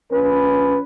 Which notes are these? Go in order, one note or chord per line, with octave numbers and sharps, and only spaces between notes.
A#1 C#4 B4